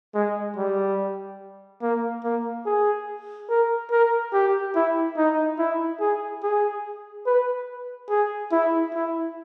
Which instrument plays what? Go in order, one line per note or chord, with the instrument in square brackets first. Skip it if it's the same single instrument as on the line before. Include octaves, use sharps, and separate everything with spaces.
[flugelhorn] G#3
G3
A#3
A#3
G#4
A#4
A#4
G4
E4
D#4
E4
G#4
G#4
B4
G#4
E4
E4